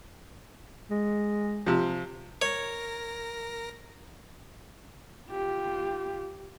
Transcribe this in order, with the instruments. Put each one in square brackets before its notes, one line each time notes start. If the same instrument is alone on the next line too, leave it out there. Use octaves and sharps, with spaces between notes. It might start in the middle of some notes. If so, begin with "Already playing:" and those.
[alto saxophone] G#3
[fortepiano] C3 F3
[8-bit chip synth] A#4 A#6 [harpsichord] C#5
[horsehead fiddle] F4 G4